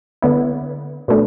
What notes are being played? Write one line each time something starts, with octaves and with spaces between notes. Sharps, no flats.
D3 B3 E4
B2 A3 D4